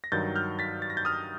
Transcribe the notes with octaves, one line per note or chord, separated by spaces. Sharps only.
A#6
G2 D#3 F#3 G6 A6
F6 G6
A6 B6
A6
A#6
G6 A6
D#6 F6